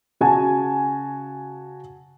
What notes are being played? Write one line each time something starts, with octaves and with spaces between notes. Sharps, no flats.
C#3 F#4 G#5 A5